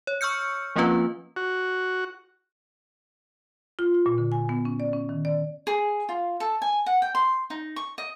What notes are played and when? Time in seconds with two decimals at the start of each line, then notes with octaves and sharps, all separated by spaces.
0.07 C#5
0.21 C#6 E6 F6 G6 C#7
0.76 F3 A#3 C4 C#4 F4 B4
1.36 F#4
3.79 F4
3.94 F4
4.06 A#2
4.18 D3
4.32 G#5
4.49 B3
4.65 C#4
4.80 D5
4.93 C#4
5.09 D#3
5.25 D5
5.67 G#4
6.09 F4
6.40 A4
6.62 G#5
6.86 F#5
7.02 G5
7.15 C6
7.50 D#4
7.76 C#6
7.98 D#5